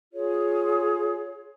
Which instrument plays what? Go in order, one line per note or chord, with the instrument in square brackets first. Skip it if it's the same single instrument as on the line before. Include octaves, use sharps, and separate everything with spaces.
[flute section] F4 G#4 C#5